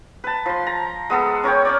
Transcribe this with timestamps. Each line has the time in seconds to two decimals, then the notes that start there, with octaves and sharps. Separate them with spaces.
0.24 B4 A5
0.46 F3 C6
0.67 A#5
1.10 G#3 B3 A4
1.43 C#4 A#4 C#5 G5
1.65 C#4 C#5 D5